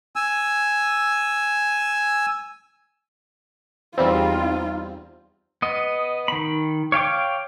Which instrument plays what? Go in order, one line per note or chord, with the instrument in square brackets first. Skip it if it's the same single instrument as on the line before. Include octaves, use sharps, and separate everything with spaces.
[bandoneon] G#5 E6
[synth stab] E2 G3 C4 [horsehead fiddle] D#4 F4
[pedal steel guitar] B3 D#5
D#3 B5
C#5 F5 G5 D6